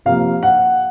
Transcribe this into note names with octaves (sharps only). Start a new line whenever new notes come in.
C3 F3 A#3 F5
F#5